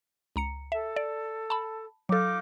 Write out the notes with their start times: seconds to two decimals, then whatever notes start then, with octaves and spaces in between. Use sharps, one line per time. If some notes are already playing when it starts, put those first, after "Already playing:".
0.36 C#2 A#5 C#7
0.72 A4 E5
0.96 D5
1.50 A5 B5
2.09 F#3 D#4 F4 A4 D6